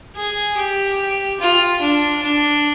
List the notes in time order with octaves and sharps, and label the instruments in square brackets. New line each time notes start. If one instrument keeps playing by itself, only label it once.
[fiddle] G#4
G4
F4
D4
D4